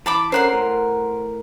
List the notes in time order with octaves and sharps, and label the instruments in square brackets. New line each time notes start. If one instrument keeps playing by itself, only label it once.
[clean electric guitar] E3 [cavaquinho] A5 B5 D6
[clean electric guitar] C#4 A4 A#4 [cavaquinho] C5 F#5 C6
[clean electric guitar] A2 A#4